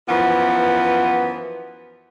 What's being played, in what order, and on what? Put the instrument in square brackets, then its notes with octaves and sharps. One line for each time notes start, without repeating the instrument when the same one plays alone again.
[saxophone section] F#2 E3 F3 B3